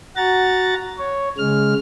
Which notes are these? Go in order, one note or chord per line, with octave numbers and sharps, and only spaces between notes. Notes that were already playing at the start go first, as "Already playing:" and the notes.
F#4 F#5 A#5 A6
C#5
C#3 G#3 F6